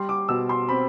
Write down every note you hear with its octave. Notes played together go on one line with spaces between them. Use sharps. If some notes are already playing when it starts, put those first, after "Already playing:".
Already playing: G3 C6
D6
B2 E6
C6
C4 B5